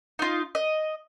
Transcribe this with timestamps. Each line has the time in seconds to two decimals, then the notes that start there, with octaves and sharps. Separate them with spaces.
0.19 D#4 F4
0.55 D#5